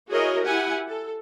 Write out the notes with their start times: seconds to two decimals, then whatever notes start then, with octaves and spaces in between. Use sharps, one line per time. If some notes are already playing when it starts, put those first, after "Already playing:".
0.10 E4 F#4 G#4 A#4 C#5 D#5
0.44 E4 G4 F#5 G#5
0.88 A4